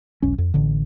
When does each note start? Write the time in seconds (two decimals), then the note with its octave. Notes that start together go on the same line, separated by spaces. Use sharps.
0.22 E1 B1 C#4
0.38 F2
0.54 A1 D3